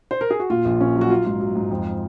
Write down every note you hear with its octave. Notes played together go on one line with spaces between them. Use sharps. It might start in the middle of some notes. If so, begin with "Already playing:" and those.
C5
A#4
G#4
F#4
A#2 F4
A#1
A#2 C#4
F#3
F#4
F#3 F4
G#2 F4
F#3
G#2
F2